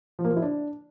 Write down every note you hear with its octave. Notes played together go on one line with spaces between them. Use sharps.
F3
A#3
F3
E4
D4